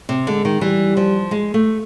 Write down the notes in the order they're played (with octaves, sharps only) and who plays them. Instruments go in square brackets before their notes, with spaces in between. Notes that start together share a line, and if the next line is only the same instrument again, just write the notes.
[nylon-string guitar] C3
[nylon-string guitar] D3 [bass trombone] G#3
[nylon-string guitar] D#3
[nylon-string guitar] E3 [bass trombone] G3
[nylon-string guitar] F3
G#3
A3